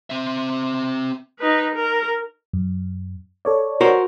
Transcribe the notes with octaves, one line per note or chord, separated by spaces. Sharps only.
C4 E5
D#4 B4
A#4
F#2
A4 C#5 D5
F#4 A#4 C5